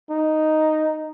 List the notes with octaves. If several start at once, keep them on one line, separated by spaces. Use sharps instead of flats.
D#4